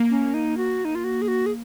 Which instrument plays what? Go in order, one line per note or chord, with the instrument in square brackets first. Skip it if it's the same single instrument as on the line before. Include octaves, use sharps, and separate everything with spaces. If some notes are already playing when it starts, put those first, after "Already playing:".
Already playing: [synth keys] A#3
[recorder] C#4
D#4
F#4
D#4
F4
F#4
G#4
F#4
G#4